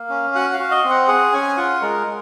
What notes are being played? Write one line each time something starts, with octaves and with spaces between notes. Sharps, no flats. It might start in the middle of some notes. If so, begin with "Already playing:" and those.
Already playing: A#3 F5
C#4
F#4 F#5
F5
F#4
D#5
C4
F#5
G#4 F#5
C#4 G#5
F4 F#5
G#3 A#4
G#3